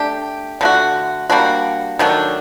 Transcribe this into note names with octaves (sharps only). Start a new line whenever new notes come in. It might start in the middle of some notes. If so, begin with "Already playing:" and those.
Already playing: A3 D4 G4
D3 A3 D4 F#4
G3 A#3 D4 F#4
D#3 F#3 A3 D4